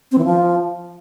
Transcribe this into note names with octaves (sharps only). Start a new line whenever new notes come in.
C4
E3
F3